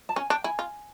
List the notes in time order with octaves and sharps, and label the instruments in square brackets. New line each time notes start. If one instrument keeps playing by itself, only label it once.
[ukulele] A5
[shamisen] C#4 [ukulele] G#5
[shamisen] D4 [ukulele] G5
[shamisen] E4 [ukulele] G#5
[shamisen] F4